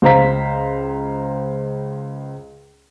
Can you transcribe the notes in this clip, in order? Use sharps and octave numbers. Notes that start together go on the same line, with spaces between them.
C#2 C5 F5 A#5 B6